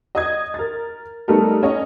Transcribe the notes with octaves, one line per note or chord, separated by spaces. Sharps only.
D#5 D#6 G#6
A#4 A6
G3 A3 B3 D#4 A4 A#4
C#4 C#5 D#5